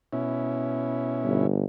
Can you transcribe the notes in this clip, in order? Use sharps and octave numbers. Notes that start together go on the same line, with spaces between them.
B2 C#4 E4
G1